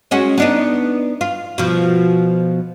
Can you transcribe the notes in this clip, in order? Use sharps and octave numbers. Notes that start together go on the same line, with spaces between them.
G#3 C#4 F#4
B3 D4 D#4
F4
B2 F3